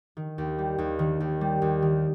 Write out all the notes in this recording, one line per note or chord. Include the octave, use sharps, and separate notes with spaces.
D#3
D#2
G3
D#2
D#3
D#2
G3
D#2
D#3